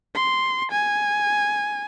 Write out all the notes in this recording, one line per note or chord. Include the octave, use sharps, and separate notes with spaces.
C6
G#5